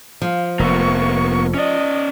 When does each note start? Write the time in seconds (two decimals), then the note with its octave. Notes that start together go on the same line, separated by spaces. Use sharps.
0.22 F3 F5
0.59 F1 A#3 B3 C#6
1.54 C#4 D5 D#5